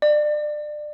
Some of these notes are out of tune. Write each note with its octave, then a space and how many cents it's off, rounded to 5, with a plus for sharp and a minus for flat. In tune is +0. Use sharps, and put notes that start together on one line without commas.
D5 +25